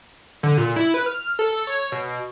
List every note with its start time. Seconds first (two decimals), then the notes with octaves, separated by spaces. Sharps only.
0.43 D3
0.58 A#2
0.76 E4
0.94 B4
1.06 F6
1.39 A4
1.52 A4
1.67 C#5
1.92 B2